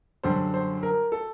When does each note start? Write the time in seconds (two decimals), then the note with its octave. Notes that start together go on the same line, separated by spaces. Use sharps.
0.24 F#2 D3 G3 C5
0.54 C5
0.83 A#4
1.12 A4